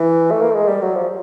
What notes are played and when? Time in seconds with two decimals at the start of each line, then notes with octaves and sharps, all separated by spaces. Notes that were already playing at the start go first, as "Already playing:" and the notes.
Already playing: E3
0.31 A3
0.42 A#3
0.51 A3
0.55 G#3
0.68 G3
0.81 F#3
0.95 F3